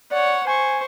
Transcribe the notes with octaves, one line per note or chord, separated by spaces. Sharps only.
C#5 D5 F#5
C5 G#5 C#6